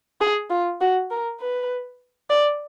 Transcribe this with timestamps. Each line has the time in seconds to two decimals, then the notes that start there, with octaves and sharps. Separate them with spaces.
0.21 G#4
0.50 F4
0.81 F#4
1.10 A#4
1.40 B4
2.30 D5